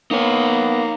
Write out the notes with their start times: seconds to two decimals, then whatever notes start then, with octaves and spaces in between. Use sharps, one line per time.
0.11 A#3 B3 D#4 C#5